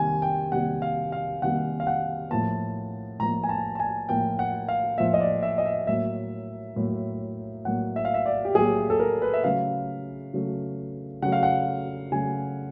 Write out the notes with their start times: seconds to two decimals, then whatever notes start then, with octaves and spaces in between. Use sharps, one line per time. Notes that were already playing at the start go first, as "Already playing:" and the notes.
Already playing: C3 D#3 G3 A#3 G#5
0.22 G5
0.52 C3 D#3 G3 A#3 F#5
0.82 F5
1.12 F5
1.42 C3 D#3 G3 A#3 F#5
1.80 F5
1.87 F#5
2.30 A2 F3 A#3 A5
3.19 A2 F3 A#3 A#5
3.43 G#5
3.49 A5
3.75 A5
3.80 G#5
4.09 A2 F3 A#3 G5
4.39 F#5
4.68 F5
4.98 A2 F3 A#3 E5
5.14 D#5
5.21 D5
5.43 E5
5.58 D#5
5.66 E5
5.87 A2 F#3 A#3 E5
6.76 A2 F#3 A#3
7.65 A2 F#3 A#3 F#5
7.96 E5
8.05 F5
8.14 E5
8.26 D5
8.45 G4
8.55 A2 F#3 A#3 G#4
8.90 A4
9.00 A#4
9.22 B4
9.34 E5
9.44 C#3 F#3 A3 F5
10.34 C#3 F#3 A3
11.22 C#3 F#3 A3 F#5
11.32 F5
11.43 F#5
12.12 C#3 F#3 A3 G#5